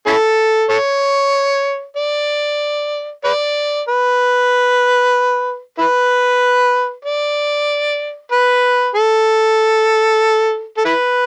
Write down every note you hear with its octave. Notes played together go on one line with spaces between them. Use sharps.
C#4 E4 A4
A4 C#5
D5
B4 D5
B4
E4 B4
D5
B4
A4
A4
E4 B4